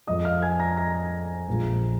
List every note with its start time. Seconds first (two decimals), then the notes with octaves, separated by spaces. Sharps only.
0.07 F2 F3 G#3 D#5 D#6
0.25 F5 F6
0.42 G#5 G#6
0.59 A#5 A#6
0.77 A#5 A#6
1.48 A#1 A#2 F3 G#3